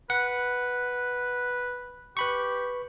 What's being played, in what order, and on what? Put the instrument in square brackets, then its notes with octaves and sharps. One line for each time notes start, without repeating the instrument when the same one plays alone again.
[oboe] B4 [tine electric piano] F#5
[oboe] G4 [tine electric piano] B4 B5 C#6